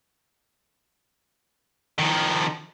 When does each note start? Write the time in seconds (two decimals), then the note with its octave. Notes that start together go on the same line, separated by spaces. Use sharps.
1.99 D#3 F3